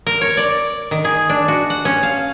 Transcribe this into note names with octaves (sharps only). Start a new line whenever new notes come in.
A#4
C#5
D5
D#3
G#4
D4
F#4
F#5
C#4
F5